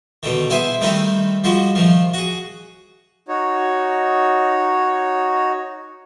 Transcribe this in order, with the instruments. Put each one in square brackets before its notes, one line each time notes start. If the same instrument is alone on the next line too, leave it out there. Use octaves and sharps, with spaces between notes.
[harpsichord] B2 D3 D#3
B3 E4 G#4 C5 E5
D#3 G3 A3 C4 D#4 E4
F3 G3 G#3 F#4
C3 D#3 F3
F#4 G#4
[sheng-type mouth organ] D#4 F#4 C#5